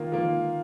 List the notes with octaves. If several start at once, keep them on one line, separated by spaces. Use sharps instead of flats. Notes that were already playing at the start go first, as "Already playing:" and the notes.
Already playing: D#3 A#3 F4
D#3 A#3 F4